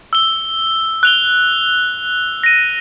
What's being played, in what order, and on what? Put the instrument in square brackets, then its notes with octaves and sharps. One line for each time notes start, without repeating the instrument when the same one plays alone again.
[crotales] E6 G7
F#6 F7 G7
A#6 D#7